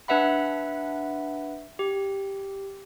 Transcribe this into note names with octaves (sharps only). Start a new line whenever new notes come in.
D4 B4 E5 F#5 B5
G4